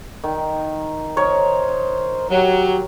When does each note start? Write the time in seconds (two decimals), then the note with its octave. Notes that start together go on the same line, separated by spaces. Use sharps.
0.24 D#3
1.17 A#4 C5 C#5 D#5
2.31 F#3 G4